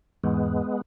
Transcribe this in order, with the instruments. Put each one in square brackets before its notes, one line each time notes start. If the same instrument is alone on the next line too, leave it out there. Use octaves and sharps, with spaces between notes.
[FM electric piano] E2 G#2 [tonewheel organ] G#3 B3